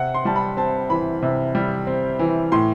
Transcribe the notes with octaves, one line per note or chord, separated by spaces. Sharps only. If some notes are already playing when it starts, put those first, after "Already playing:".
Already playing: C3 F#5
C6
G3 A5
B5
C4 A5
E3 B5
C3
G3
C4
E3
A2 C6